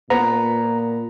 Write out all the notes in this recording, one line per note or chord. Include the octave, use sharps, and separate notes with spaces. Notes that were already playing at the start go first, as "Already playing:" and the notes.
A#2 B3 A#5